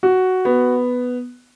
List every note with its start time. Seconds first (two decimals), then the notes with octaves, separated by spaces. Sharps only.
0.03 F#4
0.45 B3